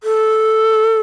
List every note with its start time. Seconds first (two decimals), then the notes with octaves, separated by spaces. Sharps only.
0.03 A4